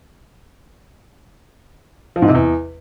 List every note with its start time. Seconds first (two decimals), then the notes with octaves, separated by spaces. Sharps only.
2.16 F3
2.22 G#2
2.28 C3
2.35 E2